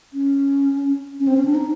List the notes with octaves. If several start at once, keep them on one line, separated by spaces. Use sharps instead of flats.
C#4
C#4
C4
C#4
D4
D#4